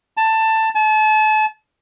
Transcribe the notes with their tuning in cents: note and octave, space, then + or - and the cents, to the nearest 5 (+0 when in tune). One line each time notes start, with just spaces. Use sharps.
A5 +15
A5 -35